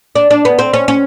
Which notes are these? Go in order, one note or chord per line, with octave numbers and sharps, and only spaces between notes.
D4
D4
B3
C4
C#4
C#4